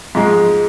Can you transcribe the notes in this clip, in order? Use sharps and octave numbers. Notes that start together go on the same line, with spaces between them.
G#2 F3 G#3